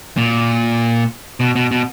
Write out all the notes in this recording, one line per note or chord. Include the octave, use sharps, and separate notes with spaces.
A#2
B2
B2
B2